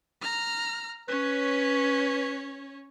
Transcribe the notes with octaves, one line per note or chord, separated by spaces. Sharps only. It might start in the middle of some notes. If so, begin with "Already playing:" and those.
A#5 F6
C#4 B4 C#5